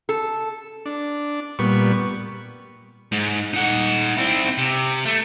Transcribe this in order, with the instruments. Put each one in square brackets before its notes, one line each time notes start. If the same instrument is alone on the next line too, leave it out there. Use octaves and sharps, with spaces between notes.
[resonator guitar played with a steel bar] A4
[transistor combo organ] D4
A#2 G3 B3 C#6
[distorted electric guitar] G#2
D#4 F#5
C4 E4
C3
A3